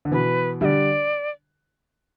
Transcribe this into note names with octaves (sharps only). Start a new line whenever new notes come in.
D3
B2 E3 B4
D3 G3 D5 E5